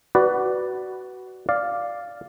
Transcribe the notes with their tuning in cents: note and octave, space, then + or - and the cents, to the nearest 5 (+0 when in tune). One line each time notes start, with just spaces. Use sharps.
F#4 +20 B4 +0 D5 +0
D5 +0 F5 +0